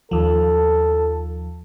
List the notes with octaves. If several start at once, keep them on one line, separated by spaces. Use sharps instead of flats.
D#2 F3 A4